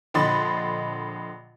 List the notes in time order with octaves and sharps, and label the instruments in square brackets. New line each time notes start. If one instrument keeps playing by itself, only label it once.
[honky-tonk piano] A#1 D3 D#5 B5 C6 A6